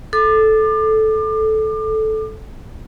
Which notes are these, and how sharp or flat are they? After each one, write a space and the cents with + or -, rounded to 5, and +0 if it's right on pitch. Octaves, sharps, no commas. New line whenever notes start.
A4 -15 D6 +30